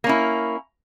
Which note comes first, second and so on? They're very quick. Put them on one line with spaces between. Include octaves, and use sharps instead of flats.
A#3 C#4 E4